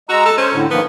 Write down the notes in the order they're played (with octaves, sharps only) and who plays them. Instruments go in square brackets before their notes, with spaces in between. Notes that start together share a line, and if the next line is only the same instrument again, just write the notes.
[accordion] G#3 A#5 E6 [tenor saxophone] F#4
[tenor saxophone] A4
[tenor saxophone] C#4 [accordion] C5
[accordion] A2 D3
[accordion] D#3 F3 A#3 [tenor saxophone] B3